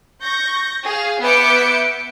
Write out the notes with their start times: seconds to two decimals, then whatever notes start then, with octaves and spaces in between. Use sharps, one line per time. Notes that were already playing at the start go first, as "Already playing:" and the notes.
0.22 C#6 G6 A#6
0.85 G#4 F5
1.21 B3 E5 D6 G6 C#7